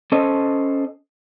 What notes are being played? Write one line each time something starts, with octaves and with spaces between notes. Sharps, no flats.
C#4 A4 C5 D#5